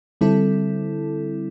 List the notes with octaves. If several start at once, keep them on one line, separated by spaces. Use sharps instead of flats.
D3 G3 C4 E4 A4